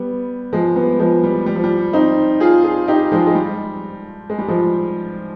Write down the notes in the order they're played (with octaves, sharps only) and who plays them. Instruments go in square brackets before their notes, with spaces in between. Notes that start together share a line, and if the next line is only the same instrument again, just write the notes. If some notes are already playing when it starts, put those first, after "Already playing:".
Already playing: [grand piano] G3 B3
F3 G#3
G3 B3
F3 G#3
G3
G3
F3
G3
C4 D#4
F4 G#4
F4 G#4
D#4 G4
F3 G#3
G#3
G3
G#3
G3
F3 G#3